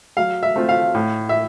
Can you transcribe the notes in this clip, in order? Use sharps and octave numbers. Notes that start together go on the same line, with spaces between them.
F#3 F5
E5
A3 C4 F4
F5
A2
E5